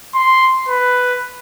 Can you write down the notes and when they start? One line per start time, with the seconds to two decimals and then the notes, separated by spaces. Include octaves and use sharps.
0.14 C6
0.68 B4